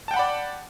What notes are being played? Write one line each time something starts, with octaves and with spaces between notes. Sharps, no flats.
D5 F#5 G5 A5 B5